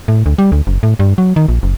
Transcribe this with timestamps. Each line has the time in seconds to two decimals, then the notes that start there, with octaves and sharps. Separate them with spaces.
0.08 A2
0.26 D2
0.38 G3
0.52 D2
0.67 F#1
0.83 A2
0.99 G2
1.18 F#3
1.36 D#3
1.48 A#1
1.63 F#1